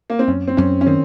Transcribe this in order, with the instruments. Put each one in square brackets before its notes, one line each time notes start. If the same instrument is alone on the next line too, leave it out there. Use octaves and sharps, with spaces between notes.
[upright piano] A#3
C4
[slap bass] F#2 [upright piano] C#4
[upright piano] C4
[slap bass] F#2 [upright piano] C#4
[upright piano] C#4
[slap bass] D#3 [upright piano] C4